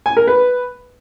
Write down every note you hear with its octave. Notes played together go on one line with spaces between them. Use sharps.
G#5
A#4
B4